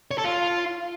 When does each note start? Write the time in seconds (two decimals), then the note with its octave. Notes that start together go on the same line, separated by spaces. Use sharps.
0.11 C#5
0.18 A4
0.25 F4